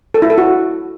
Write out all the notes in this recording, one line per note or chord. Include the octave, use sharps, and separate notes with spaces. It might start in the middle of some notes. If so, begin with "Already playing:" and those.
A4
E4
A4
F#4